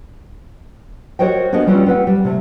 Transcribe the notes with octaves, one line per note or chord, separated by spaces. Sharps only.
F#4 A#4 C5 C#5 D#5 G5
B3 D4 F#4 G#4 A#4 D#5
G3 C4 C#4 F4 F#4 B4
C4 B4 F#5
G3
C3 A3